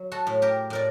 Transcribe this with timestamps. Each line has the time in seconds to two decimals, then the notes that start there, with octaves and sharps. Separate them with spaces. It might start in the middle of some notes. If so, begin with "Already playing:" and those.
Already playing: F#3
0.12 F#4 A4
0.27 A2
0.42 G4 A#4
0.70 A2 A#4 D5